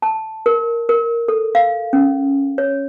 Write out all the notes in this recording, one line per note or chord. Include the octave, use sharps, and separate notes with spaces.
A5
A#4
A#4
A4
F5
C#4
C#5